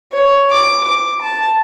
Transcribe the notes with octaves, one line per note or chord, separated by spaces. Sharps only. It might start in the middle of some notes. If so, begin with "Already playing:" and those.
C#5
D6
D6
A5